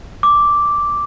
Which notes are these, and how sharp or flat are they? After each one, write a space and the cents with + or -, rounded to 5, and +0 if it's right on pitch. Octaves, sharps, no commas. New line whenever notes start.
D6 -5